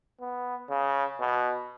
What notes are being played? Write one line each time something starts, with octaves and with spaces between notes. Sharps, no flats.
B3
C#3
B2